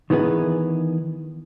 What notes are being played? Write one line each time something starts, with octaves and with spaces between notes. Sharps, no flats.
D#3 E3 B3 G#4 B4